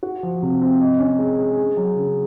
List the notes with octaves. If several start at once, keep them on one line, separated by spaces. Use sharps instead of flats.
F#4
F3
C3
C4
D#5
C#4
G#3
G#4
G#4
F#3
C#3